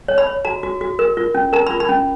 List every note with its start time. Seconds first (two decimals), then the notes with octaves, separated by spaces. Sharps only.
0.08 C#5
0.18 B5
0.27 C#5
0.45 F#4 A#5
0.63 F#4
0.81 F#4
0.99 A#4
1.17 F4
1.34 C#4
1.53 A#4 A#5
1.67 F4 B5
1.80 B5
1.89 C#4